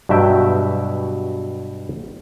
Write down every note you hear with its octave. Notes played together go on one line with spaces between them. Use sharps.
G2 B2 F#3 E5 G5